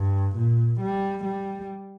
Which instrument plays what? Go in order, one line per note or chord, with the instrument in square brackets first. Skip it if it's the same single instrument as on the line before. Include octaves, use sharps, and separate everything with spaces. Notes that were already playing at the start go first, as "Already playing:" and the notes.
Already playing: [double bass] G2
A#2
G3
G3